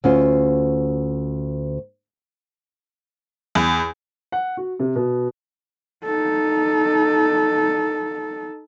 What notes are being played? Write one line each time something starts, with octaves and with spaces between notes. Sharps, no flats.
D2 C#4 F4
E2
F#5
F#4
C3
B2
D#4 A4